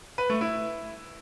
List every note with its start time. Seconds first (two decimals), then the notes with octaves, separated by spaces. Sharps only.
0.18 B4
0.30 A3
0.41 E4